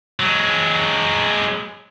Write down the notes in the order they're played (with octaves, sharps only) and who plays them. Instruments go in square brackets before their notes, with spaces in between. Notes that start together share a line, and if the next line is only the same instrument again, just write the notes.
[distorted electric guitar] F#3 G#3